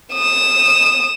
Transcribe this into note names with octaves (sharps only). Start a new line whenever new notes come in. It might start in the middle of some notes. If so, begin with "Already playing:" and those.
D#6 E7